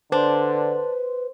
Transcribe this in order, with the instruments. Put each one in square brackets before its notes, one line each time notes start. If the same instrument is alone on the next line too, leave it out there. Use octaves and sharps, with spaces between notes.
[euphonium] D3 [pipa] D4 [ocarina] B4 [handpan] C5